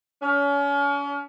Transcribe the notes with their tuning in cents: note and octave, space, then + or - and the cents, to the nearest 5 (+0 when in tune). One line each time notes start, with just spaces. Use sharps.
C#4 +35